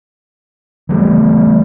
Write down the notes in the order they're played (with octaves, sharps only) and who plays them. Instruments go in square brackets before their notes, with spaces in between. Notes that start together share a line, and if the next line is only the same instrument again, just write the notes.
[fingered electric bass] E3 G3 A3